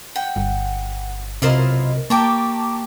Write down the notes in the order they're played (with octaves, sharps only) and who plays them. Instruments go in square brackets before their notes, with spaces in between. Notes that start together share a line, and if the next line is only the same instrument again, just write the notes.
[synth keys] F#5 [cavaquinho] G5
[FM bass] G1
[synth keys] B1 A#4 D#5 [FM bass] C3 [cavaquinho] E4 F4 C5
[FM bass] A#3 [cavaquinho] G4 G5 C#6 [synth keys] A5 A#5 D6